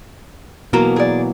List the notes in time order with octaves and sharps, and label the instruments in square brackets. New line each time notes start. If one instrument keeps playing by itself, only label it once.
[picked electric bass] B2 [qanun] E3 F#3 A#3 [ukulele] A#4
[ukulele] G#4 D5